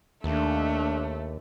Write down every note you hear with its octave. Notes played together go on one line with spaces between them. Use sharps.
D#2 A3 D4